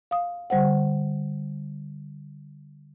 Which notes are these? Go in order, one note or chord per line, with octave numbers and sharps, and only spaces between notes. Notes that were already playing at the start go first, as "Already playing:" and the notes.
F5 D#6
D3 G3 C5 F#5